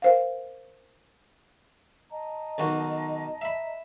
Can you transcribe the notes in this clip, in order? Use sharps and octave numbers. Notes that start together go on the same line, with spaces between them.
A#4 C5 F5
D#5 A5 A#5
B1 D#3 F#4
E5 B5